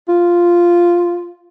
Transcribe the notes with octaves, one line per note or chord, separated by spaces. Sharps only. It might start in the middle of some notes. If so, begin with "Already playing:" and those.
F4